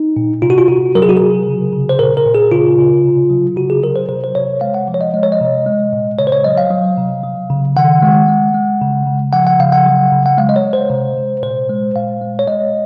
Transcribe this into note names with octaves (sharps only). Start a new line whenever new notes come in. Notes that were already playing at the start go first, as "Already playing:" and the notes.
Already playing: D#4
A#2
C3 F4
F#4
F4
C3 F#4
F#3 A#4
G#4
F#4
C3 G#4
C#3
C#3
C5
A#2 A#4
A#4
A#2
G#4
C#3 F4
C#3
C3
F#3
C#3 F#4
G#4
F#3 A#4
C5
C3 C5
C5
C3 C#5
G#3 F5
F#5
F3
C#5
D#5
G#3 D#5
C#5
D#5
C3
G#3
A#2
C#3 C#5
C5
C#5
F#3 D#5
F5
F#3
C3
F#3
C#3
D#3 F#5
G#3
G#3
G#3
C#3
C#3
F3 F#5
F#5
C#3 F5
F#5
F#3
C#3
F#5
G#3 F5
D#5
C#5
G#3
C5
C3
C3
A#2 C5
G#3
A#2 F5
G#3
C#5
G#3 D#5